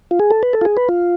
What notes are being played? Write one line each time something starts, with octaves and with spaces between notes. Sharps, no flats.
F4
G#4
A4
B4
A4
F4
G#4
B4
F4